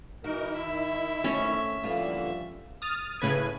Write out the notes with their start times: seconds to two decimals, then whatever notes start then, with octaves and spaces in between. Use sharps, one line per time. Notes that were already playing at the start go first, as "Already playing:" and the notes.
0.24 E3 D#4 F#4 A#4
0.54 D#3 E4 E5
1.24 A3 C4 C#4 C#5
1.83 A#2 D3 E3 F3 G3 F4
2.82 D#6 F6 A6
3.19 A2 C#3 B4 G#6 D#7